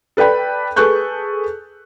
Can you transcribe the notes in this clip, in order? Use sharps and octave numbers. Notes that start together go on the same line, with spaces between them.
A4 B4 D5 G5 B5
G#4 A4 B4 C#6 F#6 G6